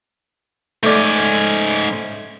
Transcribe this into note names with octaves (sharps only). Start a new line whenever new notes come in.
G#2 A3 C#4 D5